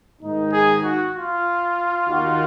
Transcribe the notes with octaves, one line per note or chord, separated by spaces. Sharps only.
G#2 D#3 A#3 D#4
G#4
F#4
F4
D#2 D#3 A#3 D#4 F#4